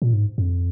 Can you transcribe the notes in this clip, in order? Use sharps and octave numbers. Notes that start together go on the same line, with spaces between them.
A#2
G#2
F2